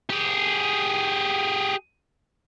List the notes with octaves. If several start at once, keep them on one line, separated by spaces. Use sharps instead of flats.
G4 G#4